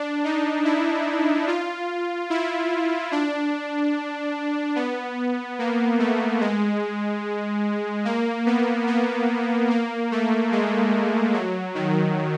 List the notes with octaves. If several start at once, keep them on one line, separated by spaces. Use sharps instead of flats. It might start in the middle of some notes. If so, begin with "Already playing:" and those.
Already playing: D4
D#4
E4
F4
E4
D4
B3
A#3
A3
G#3
A#3
B3
B3
A#3
A3
G#3
F#3
D#3